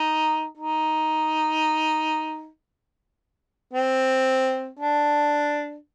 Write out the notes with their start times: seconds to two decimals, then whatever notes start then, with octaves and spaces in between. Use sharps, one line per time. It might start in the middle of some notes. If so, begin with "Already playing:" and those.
Already playing: D#4
0.57 D#4
3.74 C4
4.79 D4